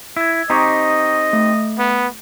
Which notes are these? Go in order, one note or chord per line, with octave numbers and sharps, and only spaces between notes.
E4 E6 G#6
C4 D#4 G4 D#5 A#5 C#6 D6
A3
B3